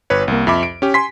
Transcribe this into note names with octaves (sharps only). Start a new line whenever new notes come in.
G1 B4 C#5
C2 A#3
F2 E5 B5 D6
D7
C#4 G4
G#5 C6 B6